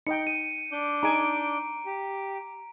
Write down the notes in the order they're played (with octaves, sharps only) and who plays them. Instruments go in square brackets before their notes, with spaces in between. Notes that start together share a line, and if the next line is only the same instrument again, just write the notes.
[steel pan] D#4 D#5 G5 [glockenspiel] C#7
[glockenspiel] D#7
[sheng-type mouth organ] D4 D6 G6
[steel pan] D#4 G#4 G#5 [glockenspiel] A#5 D7
[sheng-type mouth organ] G4